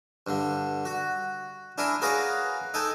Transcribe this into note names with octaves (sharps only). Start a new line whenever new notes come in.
G2 D3
F#4
D4 E4 A#4 G#5
F#4 G#4 A#4 B4 C#5 F5
D#4 A4 G5 G#5